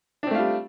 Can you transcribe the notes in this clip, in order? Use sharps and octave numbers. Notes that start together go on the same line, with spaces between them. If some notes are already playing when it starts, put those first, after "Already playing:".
G3 A3 C4 D4 F4